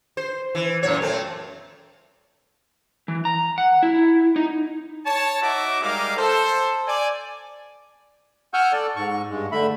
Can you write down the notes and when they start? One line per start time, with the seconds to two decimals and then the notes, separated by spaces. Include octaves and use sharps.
0.17 C5
0.55 E3
0.83 F#2 A#2 C#5
1.02 A3 C4
3.08 E3
3.25 A#5
3.58 F#5
3.83 E4
4.36 D#4
5.06 C#5 A5
5.42 D#4 F#4 E5 D6
5.81 G3 G#3 D#4 A#4 F5 D6
6.17 A4 C5
6.87 D5 G#5
8.54 F#5 G#5 C#6 E6 F6 G6
8.72 A4 D5
8.96 G#2 C#6
9.30 G2 G#3
9.52 D3 A3 E5 B5